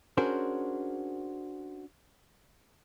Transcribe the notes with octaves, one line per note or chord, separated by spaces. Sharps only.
C#4 D4 F#4 G#4 A#4 C5